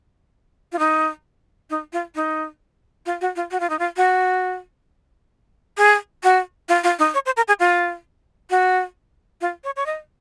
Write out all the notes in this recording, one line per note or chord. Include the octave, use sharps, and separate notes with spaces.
F4
D#4
D#4
F4
D#4
F4
F#4
F4
F#4
F4
D#4
F4
F#4
G#4
F#4
F4
F4
D#4
C#5
C5
A#4
G#4
F4
F#4
F4
C#5
C#5
D#5